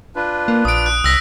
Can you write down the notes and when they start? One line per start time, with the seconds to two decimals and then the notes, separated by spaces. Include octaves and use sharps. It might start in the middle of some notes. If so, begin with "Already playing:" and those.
0.16 D4 F4 B4
0.48 A#3
0.65 A#1 D#6 D7
0.86 F#6
1.04 C2 E6 A#6 B6